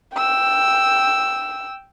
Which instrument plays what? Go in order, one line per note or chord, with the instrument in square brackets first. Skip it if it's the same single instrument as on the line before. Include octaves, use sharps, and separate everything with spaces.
[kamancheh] G5 E6